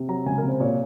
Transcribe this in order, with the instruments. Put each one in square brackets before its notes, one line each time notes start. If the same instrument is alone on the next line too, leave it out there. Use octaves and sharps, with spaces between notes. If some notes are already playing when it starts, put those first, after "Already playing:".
Already playing: [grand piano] C3
F#3 A#5
C#2 G#5
A#4
C3
C5
A#2 C#5